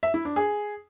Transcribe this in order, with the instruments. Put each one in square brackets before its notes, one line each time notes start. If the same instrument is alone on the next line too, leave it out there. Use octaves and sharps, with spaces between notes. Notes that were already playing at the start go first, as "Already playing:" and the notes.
[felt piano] E5
E4
D4
G#4